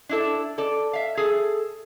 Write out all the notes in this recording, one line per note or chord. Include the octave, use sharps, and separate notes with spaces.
D4 E4 A4
A4 D5
E5 F5
G#4 A4